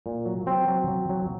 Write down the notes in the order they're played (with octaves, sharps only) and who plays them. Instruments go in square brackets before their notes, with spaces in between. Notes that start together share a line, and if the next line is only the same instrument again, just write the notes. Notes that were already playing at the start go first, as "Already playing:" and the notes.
[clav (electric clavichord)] A#2
F#3
F#3 C4
F#3
F#3
F#3